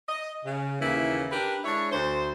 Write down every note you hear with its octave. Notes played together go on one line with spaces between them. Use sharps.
D#5
C#3
D#2 C#3 E3 A#3 E4
D4 G4 A#4 B4
G#3 D4 E4 C#5
D2 C5